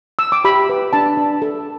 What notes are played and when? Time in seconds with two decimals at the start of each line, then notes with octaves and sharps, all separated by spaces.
0.19 E6
0.32 D6
0.45 G4 B5
0.69 B4
0.93 D4 A5
1.17 D4
1.42 A4